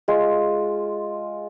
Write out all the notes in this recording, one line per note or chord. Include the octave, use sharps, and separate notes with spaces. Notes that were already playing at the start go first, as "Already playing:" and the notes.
G#3 F4